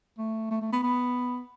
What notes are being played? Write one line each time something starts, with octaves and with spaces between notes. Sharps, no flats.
A3
A3
A3
B3
B3